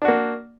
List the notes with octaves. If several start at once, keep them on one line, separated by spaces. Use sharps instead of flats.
A#3 D4 F#4